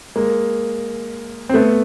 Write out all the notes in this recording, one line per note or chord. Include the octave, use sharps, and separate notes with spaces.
G#3 A#3
C4
A3 B3